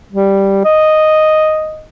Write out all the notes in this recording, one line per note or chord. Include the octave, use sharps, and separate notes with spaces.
G3
D#5